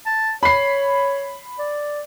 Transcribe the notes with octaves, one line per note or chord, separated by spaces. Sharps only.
A5
C#5 B5 C7
D5